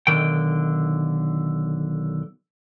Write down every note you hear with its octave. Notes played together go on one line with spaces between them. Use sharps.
B1 E2 D3 D#3 G5